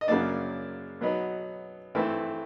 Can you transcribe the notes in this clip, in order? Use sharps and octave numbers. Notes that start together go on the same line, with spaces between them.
D#5
F#2 C#3 F#3 A#3 D4 D5
B2 F#3 B3 D#4
G2 E3 A3 C4 E4